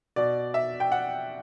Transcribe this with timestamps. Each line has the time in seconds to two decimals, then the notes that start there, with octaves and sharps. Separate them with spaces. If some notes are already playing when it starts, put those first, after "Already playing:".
0.16 B2 D5
0.54 E5
0.80 G5
0.92 F#5